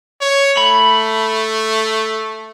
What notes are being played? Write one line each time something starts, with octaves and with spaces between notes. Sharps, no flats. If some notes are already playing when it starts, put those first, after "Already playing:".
C#5
A3 B5